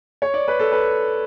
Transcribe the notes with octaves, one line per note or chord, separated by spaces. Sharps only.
C#5
D5
B4
A4
B4